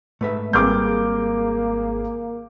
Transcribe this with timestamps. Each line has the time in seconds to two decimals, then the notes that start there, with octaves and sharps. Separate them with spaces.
0.21 G#2 A3 B4 E5
0.53 G#1 G3 A#3 C4 G#4 D6 F6 G6